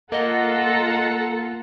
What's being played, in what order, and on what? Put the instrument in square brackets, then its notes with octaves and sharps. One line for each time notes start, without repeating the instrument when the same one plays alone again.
[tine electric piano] A#3 [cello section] F4 A4 [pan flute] D#5 [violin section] F#5 A#5